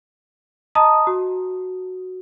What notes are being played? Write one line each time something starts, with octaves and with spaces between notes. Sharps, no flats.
D#5 A5 A#5 D#6
F#4